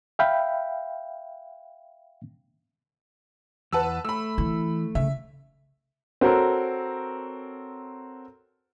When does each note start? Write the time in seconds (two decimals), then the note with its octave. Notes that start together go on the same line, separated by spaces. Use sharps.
0.19 E5 F5 G5 B5
3.73 E2 B4 F#5 A5 E6
4.05 A3 B5 E6
4.38 E3
4.95 C#3 E5
6.21 C4 F#4 A4 A#4 C#5